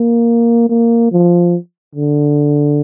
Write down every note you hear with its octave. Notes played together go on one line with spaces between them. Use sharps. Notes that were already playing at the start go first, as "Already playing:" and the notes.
Already playing: A#3
A#3
F3
D3